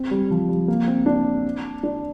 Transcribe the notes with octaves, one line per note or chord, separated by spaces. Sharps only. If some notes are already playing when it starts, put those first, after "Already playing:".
Already playing: C4
G3
F3
G3
A#3
C4
D4
D4